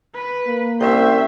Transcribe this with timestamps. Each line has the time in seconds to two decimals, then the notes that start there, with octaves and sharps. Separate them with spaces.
0.14 B4
0.48 A#3
0.81 C2 C#4 C5 E5 G5